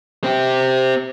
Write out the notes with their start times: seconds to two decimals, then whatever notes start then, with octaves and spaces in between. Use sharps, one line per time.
0.24 C4 G4